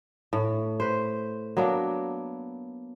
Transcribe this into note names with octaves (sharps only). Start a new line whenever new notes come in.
A2
B4 C5
F#3 A#3 B3 D4